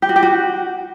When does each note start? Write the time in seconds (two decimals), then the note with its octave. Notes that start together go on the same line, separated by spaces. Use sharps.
0.02 G4
0.09 F#4
0.16 G4
0.23 F#4